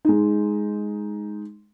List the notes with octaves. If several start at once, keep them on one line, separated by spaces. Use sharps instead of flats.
G#3 D#4